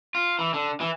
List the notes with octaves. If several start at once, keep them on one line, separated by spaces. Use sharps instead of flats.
F4
E3
D3
E3